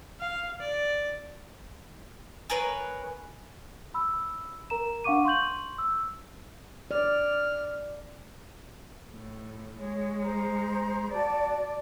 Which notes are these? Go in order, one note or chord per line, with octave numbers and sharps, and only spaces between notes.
F5
D5
G#4 A#4 B4 C#5
B5 E6
A#4 A#5 E7
D4 F5 F#5 C#6 D6 D#7
C6 C#6 G6 F#7
E6
D5 F6
A2
G#3 C#5
C5 A#5
F#4 D5 A5